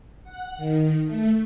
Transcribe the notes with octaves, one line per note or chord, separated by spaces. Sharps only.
F#5
D#3
A3